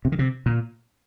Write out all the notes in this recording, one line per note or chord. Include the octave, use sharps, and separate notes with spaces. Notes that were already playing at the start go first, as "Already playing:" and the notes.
C3
D#3
C3
A#2